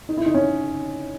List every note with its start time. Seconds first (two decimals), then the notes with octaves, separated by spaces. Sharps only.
0.09 D#4
0.17 E4
0.26 D#4
0.34 C#4